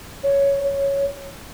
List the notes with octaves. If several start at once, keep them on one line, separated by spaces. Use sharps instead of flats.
C#5
C#5